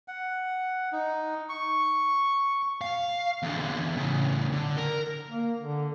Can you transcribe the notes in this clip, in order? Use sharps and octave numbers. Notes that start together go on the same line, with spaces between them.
F#5
D#4
C#6
F5
E2 D3
E2
A2 C#3
D3
A#4
A#3
D3